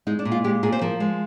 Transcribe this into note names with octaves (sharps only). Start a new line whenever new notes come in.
G#3 D#4
D4
A#2
F4
G#3 G4
A#2 G#4
C5
F3 A#4
G#3